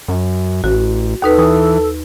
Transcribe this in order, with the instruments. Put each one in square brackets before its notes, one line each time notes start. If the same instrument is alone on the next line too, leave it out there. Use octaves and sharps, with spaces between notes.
[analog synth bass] F#2
[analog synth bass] A1 [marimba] F#4
[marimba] D#2 D#4 B4 [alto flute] A4
[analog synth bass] E3 [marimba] D#6